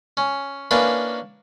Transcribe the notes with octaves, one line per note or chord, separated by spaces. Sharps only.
C#4
A#3 C#4 D4 E4 B4